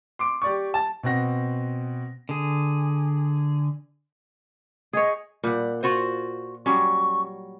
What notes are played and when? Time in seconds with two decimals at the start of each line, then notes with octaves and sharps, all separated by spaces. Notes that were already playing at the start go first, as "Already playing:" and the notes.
0.19 C6 D6 D7
0.42 G4 D5 C#6
0.74 A5
1.03 B2 B3 C4 F#5 A#6
2.29 D3 G#4
4.93 G#4 C#5 D#5
5.43 A#2 G3 F#5
5.83 F4 F#4 C5
6.66 F#3 G3 C#4 C#6